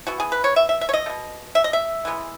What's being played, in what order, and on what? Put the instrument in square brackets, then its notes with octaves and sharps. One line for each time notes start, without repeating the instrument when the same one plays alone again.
[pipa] E3 B3 F#4
G#4
B4
C#5
E5
E5
E5
C#5
D#5
A3
B2
E5
D#5
E5
E3 G#3 B3